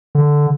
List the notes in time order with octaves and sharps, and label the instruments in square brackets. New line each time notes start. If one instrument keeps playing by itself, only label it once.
[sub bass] D3